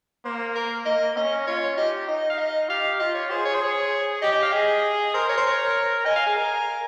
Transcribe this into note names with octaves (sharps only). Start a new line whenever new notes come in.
A#3 C5
A#4
A#3 D#5
C#4 D#5
F4 C#5
G4 D#5
D#4 D#5
F5
D#5
G4 F5
F4 D#5
C#5
G#4 C5
C#5
C5
G#4 C#5
G4 D#5
D#5
F5
G#4 D#5
A#4 C5
C#5
C5
C#5
D#5 G#5
F5
G#4
A#4